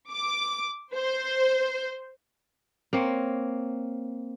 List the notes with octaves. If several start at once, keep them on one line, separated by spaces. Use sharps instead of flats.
D6
C5
A#3 C4 C#5